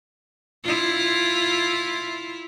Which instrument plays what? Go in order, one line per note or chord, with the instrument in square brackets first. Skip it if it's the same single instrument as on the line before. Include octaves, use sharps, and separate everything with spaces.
[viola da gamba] E4 F4